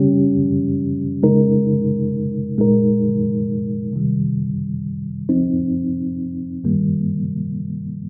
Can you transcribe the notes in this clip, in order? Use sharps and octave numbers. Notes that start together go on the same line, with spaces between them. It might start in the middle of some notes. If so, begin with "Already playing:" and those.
Already playing: C#3 G3 C#4 G4
C#3 G#3 D#4 A#4
A#2 G#3 D#4 A#4
C3 D#3 G3
F3 C4 D#4
G2 D#3 G3 A#3